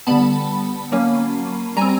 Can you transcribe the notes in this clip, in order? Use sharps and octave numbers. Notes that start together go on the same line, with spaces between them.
D3 G3 B3 A5 B5
F#3 A#3 C#4
G3 C4 G#5 A#5